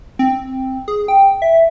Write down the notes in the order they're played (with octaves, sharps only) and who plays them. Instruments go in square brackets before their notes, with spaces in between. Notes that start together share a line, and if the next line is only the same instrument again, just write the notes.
[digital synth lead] C4
G#4
G5
E5